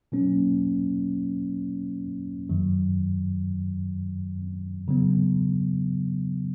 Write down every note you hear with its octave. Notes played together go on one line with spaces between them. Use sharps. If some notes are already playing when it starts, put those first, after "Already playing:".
B2 F#3 A#3 C#4
F#2 D#3 F#3
C#3 F#3 B3